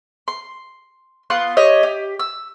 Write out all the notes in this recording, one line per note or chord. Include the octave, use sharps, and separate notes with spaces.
C6
B3 F4 C6 F#6
G4 C#5 D#5
G4
E6